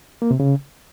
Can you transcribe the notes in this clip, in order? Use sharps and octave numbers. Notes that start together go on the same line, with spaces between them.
A#3
C3
C#3